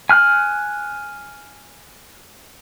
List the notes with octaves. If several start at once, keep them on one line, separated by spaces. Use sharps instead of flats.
G#5 F6 F#6